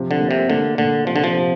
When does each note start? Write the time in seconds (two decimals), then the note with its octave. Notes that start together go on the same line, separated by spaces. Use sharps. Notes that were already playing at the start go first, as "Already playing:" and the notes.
Already playing: C3 F3
0.11 D3
0.20 A#3
0.31 C3
0.50 D3 A#3
0.78 A#2 D3
1.07 C3 F3
1.16 D3
1.24 F3
1.36 C3